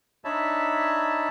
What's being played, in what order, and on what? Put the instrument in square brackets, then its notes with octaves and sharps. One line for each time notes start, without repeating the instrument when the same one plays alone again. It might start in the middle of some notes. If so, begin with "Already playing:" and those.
[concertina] D4 D#4 C#5 E5 A5 B5